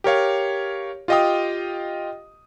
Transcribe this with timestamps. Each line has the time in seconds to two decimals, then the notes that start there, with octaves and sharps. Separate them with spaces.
0.04 G4 A#4 C#5 F5
1.08 F4 G4 D#5 F5 G5 D#6